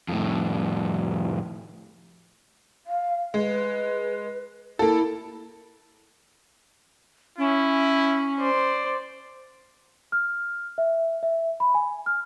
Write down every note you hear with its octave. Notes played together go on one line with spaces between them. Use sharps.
F2 A2
F5
G#3 B4
A#3 E4 A4
C#4 E4
C5 D5
F6
E5
E5
B5
G#5
F6